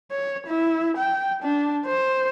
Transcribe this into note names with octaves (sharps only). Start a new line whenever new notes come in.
C#5
E4
G5
D4
C5